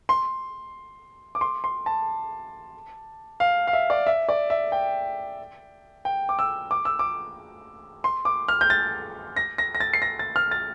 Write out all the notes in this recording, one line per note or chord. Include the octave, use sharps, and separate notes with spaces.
C6
D6
C6
C6
A5
F5
F5
E5
D5
E5
D5
E5
G5
G5
D6
E6
D6
E6
D6
C6
D6
F6
G6
A6
A#6
A#6
A#6
A6
C7
A#6
A6
F6
A6